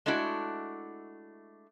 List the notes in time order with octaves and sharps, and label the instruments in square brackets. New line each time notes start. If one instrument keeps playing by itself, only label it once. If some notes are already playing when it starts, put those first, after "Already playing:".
[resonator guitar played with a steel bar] G#3 A3 D4 E4 F#4